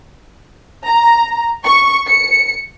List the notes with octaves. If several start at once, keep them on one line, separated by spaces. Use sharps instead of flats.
A#5
C#6
C#7